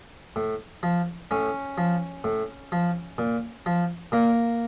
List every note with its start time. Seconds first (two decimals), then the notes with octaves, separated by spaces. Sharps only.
0.36 A2
0.83 F3
1.31 A2 C#4
1.78 F3
2.24 A2
2.72 F3
3.18 A#2
3.66 F3
4.12 A#2 A#3